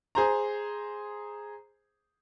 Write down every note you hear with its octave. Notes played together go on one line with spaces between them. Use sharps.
G#4 C5 A#5